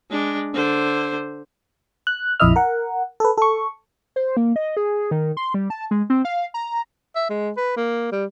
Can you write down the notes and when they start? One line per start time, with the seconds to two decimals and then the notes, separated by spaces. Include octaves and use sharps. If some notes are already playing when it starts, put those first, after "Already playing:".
0.10 G#3 D4
0.54 D3 C5
2.07 F#6
2.40 A#1 F2 E4 D#5 E5 F6
2.56 A#4 F#5
3.20 A4 B4
3.38 A4 C#6
4.16 C5
4.37 A#3
4.56 D#5
4.77 G#4
5.11 D#3
5.37 C6
5.54 G3
5.70 A5
5.91 G#3
6.10 C4
6.25 F5
6.54 A#5
7.16 E5
7.30 G#3
7.57 B4
7.77 A#3
8.12 G3